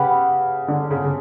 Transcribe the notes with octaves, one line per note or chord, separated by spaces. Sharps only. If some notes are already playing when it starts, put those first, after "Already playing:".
Already playing: C#3 G4 B4 F#5 B5
D3
C#3
C#3